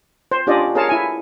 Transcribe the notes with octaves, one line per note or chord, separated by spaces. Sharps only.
C5
C#4 D4 F4 G4 D5 D#5
G#4 A#4 C#5 F5 A5
E4 G#5